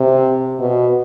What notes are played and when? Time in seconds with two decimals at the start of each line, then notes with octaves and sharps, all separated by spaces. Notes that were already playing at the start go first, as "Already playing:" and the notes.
Already playing: C3
0.60 B2